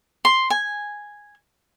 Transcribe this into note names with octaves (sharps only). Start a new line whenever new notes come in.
C6
G#5